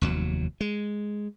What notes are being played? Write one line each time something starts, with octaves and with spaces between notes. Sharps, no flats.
F1 D#2 F#3
G#3